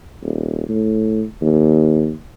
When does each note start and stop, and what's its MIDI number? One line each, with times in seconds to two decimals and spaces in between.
0.23 0.66 27
0.69 1.24 45
1.42 2.12 39